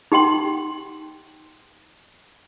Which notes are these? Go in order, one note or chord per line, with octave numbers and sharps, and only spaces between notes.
D#4 G4 F#5 G5 C6